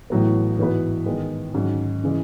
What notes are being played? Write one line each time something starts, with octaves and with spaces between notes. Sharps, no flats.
A1 A2 F#3 B3
G#2 E3 B3 F#4 B4
D#3 G#3 B3
G#2 D#3 F#3 C#4 F#4
C#3 E3 G#3